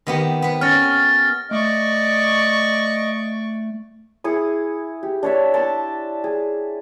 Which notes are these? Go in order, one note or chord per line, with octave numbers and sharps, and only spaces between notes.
D#3 B3 G4
B3 B4
C#4 F6 A6 A#6
A3 D5 D#5 C#6
E4 G#4 C#6 D#6
G4
D4 C#5 E5
A5 C6 D6
G#4